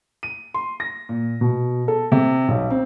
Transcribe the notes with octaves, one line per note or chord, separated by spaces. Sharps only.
D#7
C6
A#6
A#2
B2
A4
C3
B1
C4